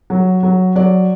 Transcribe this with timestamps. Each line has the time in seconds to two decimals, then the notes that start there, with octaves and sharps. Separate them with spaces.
0.10 F#3
0.43 F#3
0.76 F#3 D5